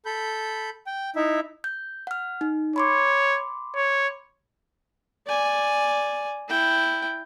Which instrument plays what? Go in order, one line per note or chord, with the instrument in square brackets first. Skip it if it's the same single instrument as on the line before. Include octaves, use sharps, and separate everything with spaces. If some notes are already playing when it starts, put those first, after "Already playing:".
[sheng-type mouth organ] A4 B5 G6
G5
D#4 E4 E5
[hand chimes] G6
F#5 F6
D#4
[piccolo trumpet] C#5 [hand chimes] B5 C6 D6
[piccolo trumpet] C#5
[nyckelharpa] D5 G#5
E4 G5